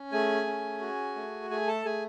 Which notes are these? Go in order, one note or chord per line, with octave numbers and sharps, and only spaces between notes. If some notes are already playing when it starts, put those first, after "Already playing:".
Already playing: C#4
A3 G#4 G#5
C#4
F#4
A3
A3 G#4 G#5
A4 A5
A3 G#4 G#5